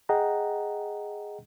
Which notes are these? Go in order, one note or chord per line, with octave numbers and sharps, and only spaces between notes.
G#4 D#5 F#5 G5 A#5